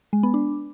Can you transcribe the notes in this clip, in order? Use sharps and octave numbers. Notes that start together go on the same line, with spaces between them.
G#3
B3
D4